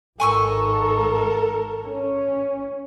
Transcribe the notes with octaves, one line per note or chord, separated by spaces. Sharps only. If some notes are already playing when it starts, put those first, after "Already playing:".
G#1 G#2 A4 A#4 G#5 C#6 E6
C#4